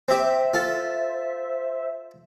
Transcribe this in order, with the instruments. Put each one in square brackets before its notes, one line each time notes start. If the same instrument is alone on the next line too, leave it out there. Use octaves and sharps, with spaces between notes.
[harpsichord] C4 G4 [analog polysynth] C5 E5
[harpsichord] F4 A4